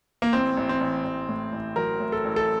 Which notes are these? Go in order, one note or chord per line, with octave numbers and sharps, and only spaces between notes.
A#3
A1 C4
A1
C4
A1
A1
A2
A1
F#3 A#4
A2
A4
A1
A4